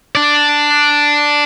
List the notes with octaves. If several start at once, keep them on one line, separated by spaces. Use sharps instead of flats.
D4 D5